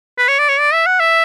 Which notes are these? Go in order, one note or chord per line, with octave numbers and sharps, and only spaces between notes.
B4
C#5
D5
C#5
D5
E5
F#5
E5